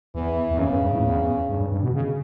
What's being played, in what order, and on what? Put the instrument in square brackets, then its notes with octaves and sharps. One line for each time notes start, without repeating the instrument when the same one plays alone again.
[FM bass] E2 [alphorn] E3
[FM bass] E2
[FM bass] F#2 [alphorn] C#3
[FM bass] F#2
G2
A2
E2
G2
G2
G2
B2
C#3